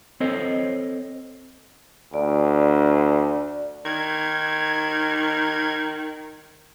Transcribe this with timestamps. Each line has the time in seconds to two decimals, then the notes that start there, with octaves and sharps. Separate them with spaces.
0.20 C4 A4 C5 C#5 D#5
2.14 D2 D5
3.85 D#3 G#6